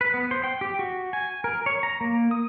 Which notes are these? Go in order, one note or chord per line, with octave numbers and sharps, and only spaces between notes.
B4
B3
C5
G5
G4
F#4
G#5
A#4
C#5
A#5
A#3
D#6